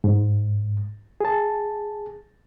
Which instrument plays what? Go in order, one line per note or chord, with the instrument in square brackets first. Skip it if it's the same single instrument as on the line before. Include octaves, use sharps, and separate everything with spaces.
[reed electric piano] G#2
G#4 A5